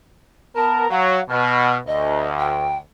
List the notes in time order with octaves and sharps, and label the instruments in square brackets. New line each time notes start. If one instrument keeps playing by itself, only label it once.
[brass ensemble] B3 A#4 [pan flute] A5
[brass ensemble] F#3 [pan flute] F5
[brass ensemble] B2 [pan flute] F6
[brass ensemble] D2 [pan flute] D#5
[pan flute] G5